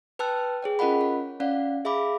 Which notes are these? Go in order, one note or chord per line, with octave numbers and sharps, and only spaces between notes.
B4 G5 A5 E6 F#6
G#4 C#5 G5
C#4 F4 A#4 D#5 F#5 B5
C#5
C#4 D5 F5 F#5
G#4 E5 F5 B5 D6